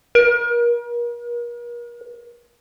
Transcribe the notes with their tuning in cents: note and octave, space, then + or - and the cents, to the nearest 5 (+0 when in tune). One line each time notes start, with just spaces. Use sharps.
A#4 +40